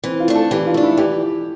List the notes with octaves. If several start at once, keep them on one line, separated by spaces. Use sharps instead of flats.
E3 C4
F4
A3 D4
A4
E3 G4
F4
A3 D4
E4
E3 G4